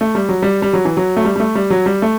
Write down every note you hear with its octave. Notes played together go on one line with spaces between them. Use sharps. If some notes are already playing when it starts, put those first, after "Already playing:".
A3
G3
F#3
G3
G3
F#3
E3
F#3
A3
G3
G3
A3
G3
F#3
G3
A3